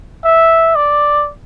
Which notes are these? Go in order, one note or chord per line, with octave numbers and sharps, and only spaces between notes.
E5
D5